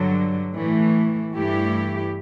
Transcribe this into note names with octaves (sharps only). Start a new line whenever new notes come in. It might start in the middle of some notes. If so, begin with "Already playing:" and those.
Already playing: G2 D3 F#3
A2 E3 A3
G2 E3 A3 E4 G4